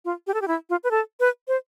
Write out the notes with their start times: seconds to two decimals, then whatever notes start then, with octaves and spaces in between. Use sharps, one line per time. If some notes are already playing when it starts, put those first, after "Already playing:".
0.05 F4
0.27 G4
0.34 A4
0.42 G4
0.48 E4
0.70 F4
0.84 B4
0.91 A4
1.20 B4
1.48 C5